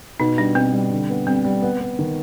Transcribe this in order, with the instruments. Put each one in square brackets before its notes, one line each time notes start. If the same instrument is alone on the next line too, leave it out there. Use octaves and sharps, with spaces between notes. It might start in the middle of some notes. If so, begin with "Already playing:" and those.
[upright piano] B2 [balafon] D#4
[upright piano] G3 [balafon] D4
[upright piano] B2 [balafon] C4
[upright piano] G3
D3
B3
[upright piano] G3 [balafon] C4
[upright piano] G3
B3
B3
D#3